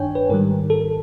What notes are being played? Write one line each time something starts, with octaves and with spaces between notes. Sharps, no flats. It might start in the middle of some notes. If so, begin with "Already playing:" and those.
Already playing: G2 D#3 D4 C#5 G5 G#5
B4
G#2 D#3 G3 A#4
A4